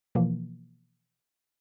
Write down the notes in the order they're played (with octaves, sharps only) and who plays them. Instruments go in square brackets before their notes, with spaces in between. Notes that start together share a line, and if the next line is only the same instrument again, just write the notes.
[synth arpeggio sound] B2 E3 F3 A#3